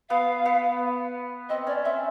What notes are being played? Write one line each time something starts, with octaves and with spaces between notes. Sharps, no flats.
B3 F5
B3
C4 D#5
C#4 D5
C4 E5